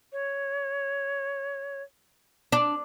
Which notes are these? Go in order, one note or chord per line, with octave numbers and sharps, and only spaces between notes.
C#5
D4